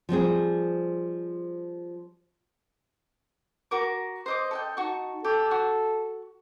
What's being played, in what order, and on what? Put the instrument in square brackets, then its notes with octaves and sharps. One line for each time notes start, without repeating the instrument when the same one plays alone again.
[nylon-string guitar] F3 G3 C4 G#4
[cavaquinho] F#4 A#4 D6
C5 D#5 D6
A4 D#5 G5
[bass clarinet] D#4 [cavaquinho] F#4 A4 C#6
[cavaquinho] G4 [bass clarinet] A4
[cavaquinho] F#4